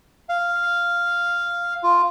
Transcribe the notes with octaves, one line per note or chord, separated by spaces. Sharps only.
F5
F4